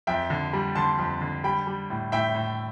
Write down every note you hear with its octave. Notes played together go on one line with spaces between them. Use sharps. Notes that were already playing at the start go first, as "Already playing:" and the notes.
F2 E5 G5
D3
G3
D3 A5 C6
F2
D3
G3 G5 B5
G3
A2
A2 E5 G5
A2